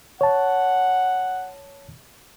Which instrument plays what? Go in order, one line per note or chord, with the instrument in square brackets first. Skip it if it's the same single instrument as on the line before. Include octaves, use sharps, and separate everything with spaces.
[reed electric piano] C#5 A5 [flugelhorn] F#5